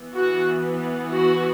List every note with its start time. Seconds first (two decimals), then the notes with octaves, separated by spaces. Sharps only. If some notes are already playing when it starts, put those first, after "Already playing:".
Already playing: E3 B3
0.14 F#4
1.07 F#4